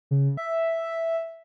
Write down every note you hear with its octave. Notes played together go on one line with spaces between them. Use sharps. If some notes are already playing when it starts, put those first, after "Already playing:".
C#3
E5